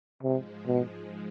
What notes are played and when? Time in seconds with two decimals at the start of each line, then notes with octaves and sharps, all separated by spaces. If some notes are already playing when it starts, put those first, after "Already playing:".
0.23 G#2 C3 F3 G#3
0.67 B2